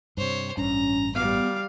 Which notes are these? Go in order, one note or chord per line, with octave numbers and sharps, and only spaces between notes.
G2 C3 C5 C#5
A1 G2 C#4 A#5
G3 B3 F5 D6